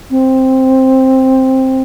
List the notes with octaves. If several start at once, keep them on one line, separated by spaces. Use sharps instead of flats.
C4